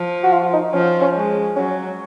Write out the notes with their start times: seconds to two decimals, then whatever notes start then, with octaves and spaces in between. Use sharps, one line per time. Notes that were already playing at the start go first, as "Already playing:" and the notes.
Already playing: F3
0.23 F#4
0.33 F4
0.53 D#4
0.73 F3 C#4
1.01 C#4
1.15 G#3
1.56 F#3 C#4